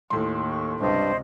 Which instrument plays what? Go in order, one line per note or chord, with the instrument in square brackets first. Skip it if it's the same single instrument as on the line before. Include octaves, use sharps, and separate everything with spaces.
[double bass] D#2 [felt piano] A2 C6
[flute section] C#6
[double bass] C#2 C3 [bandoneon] G2 [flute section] C5 D5 D#5